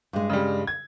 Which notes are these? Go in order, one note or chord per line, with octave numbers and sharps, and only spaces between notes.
G2 G#3
C#3 G3
G#6